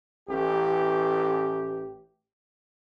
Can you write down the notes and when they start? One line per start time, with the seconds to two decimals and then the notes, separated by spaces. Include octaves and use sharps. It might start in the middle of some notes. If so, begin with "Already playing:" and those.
0.29 A1 G4